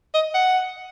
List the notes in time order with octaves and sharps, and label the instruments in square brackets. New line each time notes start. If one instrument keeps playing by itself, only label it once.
[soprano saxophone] D#5
F#5